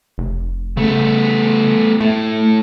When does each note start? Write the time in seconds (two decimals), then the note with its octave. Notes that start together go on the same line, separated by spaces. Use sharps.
0.18 F1
0.77 C#3 A3 B3
2.00 A2 A3